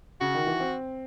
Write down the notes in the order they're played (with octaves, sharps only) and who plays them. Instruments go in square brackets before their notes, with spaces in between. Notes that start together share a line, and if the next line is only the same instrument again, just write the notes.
[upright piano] C#3 [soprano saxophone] F#4
[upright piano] D#3
E3
C4